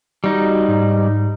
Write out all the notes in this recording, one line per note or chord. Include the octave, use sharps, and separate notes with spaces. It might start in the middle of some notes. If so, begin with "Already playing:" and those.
G3 D#4 F#4
G#2